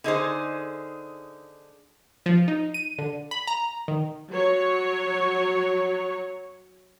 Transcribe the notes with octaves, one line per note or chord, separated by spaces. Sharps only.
D3 D#4 G#4 C5
F3
D#4
D#7
D3
B5
A#5
D#3
F#3 C#5